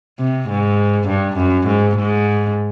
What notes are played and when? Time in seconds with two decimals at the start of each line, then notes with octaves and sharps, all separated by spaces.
0.19 C3
0.49 G#2
1.08 G2
1.37 F#2
1.67 G#2
1.97 G#2